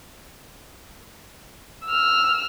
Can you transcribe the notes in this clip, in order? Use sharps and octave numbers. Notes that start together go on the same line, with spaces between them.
E6 F6